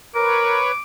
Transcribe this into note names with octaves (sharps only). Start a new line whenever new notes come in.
A#4 B4 C#5 D6